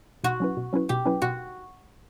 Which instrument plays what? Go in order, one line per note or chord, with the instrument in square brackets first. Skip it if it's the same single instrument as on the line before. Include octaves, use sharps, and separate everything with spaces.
[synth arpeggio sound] B2 [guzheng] F#4
[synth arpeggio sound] F#3 C#4 E4 B4
B2
F#3 C#4 E4 B4
[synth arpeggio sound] B2 [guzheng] G4
[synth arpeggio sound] F#3 C#4 E4 B4
[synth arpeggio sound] B2 [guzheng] F#4